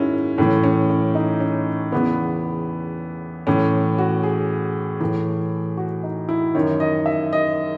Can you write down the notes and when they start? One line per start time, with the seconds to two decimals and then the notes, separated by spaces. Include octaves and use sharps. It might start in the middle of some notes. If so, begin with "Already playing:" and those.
Already playing: G#2 D#3 C#4 E4 F#4 G#4
0.38 A2 E3 C#4
0.63 C#4
0.90 C#4
1.15 D#4
1.40 C#4
1.92 E2 C#3 E3 B3
3.47 A2 E3 C#4
3.98 F#4
4.23 G#4
5.01 A2 E3
5.77 F#4
6.03 D#4
6.29 E4
6.55 F#2 D#3 C#5
6.80 D#5
7.06 E5
7.33 D#5